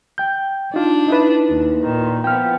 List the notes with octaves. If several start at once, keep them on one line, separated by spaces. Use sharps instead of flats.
G5 G6
D4 D#4 F4
D#4 E4 B4
D#2
A#2 D#3
F3 B3 G5 F6